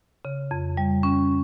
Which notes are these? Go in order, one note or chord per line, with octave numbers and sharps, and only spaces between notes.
C#3
F2
G3
C#4